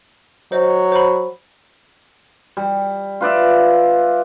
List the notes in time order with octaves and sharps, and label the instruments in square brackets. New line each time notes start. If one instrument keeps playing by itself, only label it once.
[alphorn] F#3 [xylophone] C5 D#5
[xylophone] C5 B5
[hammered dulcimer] G3
F4 B4 D5 E5